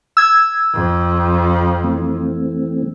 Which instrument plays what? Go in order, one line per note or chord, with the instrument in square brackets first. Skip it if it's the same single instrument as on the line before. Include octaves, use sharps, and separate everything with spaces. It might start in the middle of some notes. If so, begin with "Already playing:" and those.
[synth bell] E6 G#6
[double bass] F2
[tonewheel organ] E3 A3 C4